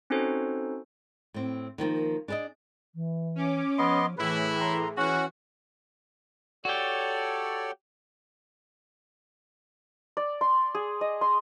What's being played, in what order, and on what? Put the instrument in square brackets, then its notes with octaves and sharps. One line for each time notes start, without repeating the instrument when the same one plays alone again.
[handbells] C4 C#4 D#4 F#4 A4 C5
[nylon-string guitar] A2 C4
D3 D#3 F3 A#3
D4 G#4 A#4 D5 D#5
[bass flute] E3
[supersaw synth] C#4 D6
[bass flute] F3 [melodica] B3 D#5 C6
[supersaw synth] A2 E3 [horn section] E4 [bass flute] G#4 [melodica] B4
[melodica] A#5 C6
[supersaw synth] E3 [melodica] C#4 F#5 [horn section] F#4
[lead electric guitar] F#4 G4 [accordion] A4 C#5 D5
[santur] D5
C6
G#4
D#5
C6